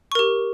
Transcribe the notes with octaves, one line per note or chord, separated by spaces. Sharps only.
G4 A#4 C#6